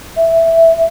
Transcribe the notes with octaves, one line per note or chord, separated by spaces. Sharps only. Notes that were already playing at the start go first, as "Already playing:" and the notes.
E5